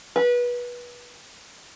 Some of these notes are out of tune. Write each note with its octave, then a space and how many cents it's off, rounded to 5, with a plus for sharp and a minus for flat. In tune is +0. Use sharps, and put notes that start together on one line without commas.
B4 -25